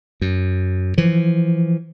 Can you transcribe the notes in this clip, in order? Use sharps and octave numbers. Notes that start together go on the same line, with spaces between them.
F#2
E3 F3